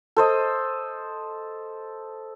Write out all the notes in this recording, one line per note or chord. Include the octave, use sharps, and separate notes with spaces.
A4 C5 D#5